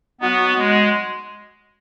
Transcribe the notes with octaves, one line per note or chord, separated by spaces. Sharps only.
F#3 B3 D#4 F#4
G#3